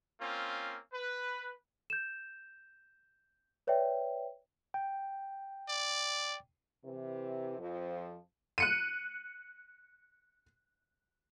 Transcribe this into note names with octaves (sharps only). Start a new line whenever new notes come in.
A#3 C4 C#4 F4
B4
G6 E7
B4 C#5 D5 E5 G5
G5
D5
C3 E3
F2 F3
F#6 C#7 D#7